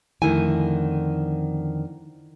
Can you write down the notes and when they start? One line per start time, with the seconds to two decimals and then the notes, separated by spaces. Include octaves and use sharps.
0.22 F2 D3 D#3 A3 E4 G#5